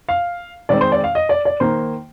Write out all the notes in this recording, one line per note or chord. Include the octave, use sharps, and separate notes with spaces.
F5
D#3 G#3 C4 D5
C5
D5
F5
D#5
D5
D5
D#3 A#3 C5